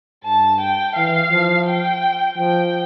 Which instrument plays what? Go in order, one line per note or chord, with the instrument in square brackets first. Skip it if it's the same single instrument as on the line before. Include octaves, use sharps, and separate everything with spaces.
[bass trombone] G2 [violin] A5
[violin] G5
[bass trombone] E3 [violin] F5
[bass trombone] F3
[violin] G5
[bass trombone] F3 [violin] G5